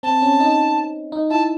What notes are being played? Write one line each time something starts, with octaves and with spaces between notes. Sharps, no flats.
C4 A5
C#4
D#4
D#4
E4 A5